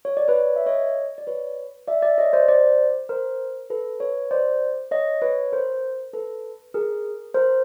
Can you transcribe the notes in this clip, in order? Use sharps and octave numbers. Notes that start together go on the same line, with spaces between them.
C#5
D5
B4 C#5
E5
C#5 D#5
D5
B4 C#5
D5 E5
D5 E5
C#5 D#5
C5 D5
C5 D5
A#4 C5
A4 B4
B4 C#5
C5 D5
C#5 D#5
B4 C#5
A#4 C5
A4 B4
G#4 A#4
A#4 C5